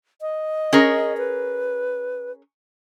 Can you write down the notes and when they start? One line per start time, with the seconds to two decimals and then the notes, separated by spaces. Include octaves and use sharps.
0.21 D#5
0.73 C#4 G#4 A#4
1.18 B4